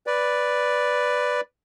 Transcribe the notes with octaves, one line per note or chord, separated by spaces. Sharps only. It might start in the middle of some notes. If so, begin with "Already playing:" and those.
B4 D5